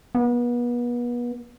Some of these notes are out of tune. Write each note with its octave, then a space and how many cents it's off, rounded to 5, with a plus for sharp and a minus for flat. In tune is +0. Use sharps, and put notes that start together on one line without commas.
B3 -35